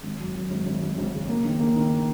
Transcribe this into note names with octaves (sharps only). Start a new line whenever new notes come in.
G#1
F#2
F#2
G#1
G#1
G#1
G#1
C#3
A#3
D#3
A#3
D#3